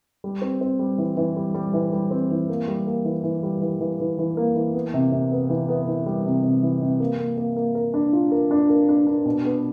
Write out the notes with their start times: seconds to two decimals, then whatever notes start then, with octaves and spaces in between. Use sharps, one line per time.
0.24 G3
0.42 C4
0.61 C4
0.79 G3
0.98 E3
1.17 E3
1.36 G3
1.54 G3
1.73 E3
1.93 G3
2.11 C4
2.31 E3
2.49 A#3
2.68 G3
2.87 A#3
3.05 E3
3.24 E3
3.43 G3
3.61 E3
3.81 E3
4.00 E3
4.18 E3
4.37 A#3
4.55 E3
4.74 B3
4.94 C3
5.12 C3
5.32 B3
5.50 E3
5.68 B3
5.87 E3
6.06 G3
6.26 C3
6.44 C3
6.63 E3
6.82 C3
7.00 A#3
7.19 A#3
7.38 A#3
7.56 A#3
7.75 A#4
7.94 D4
8.13 F4
8.31 A#4
8.51 D4
8.70 A#4
8.89 D4
9.07 D4
9.26 B2
9.45 B3